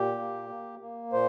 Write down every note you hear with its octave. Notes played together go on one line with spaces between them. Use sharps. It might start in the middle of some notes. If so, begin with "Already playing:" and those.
Already playing: A#2 G4
A#3
A#3
A#3
A#2 C5